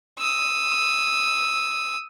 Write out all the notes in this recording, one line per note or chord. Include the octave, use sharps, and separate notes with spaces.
D#6 E6